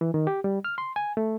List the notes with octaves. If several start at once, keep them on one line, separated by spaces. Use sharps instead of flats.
E3
D#3
G4
G3
F6
C6
G#5
A3